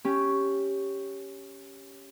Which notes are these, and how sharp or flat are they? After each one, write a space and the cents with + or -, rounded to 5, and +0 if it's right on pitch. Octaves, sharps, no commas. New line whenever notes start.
C#4 +0 G4 +0